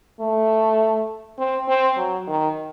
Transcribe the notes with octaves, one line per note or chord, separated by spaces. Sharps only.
A3
C4
C4
F#3
D#3